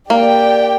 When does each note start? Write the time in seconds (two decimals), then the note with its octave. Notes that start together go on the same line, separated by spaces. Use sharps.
0.10 A#3 G4 D5 G5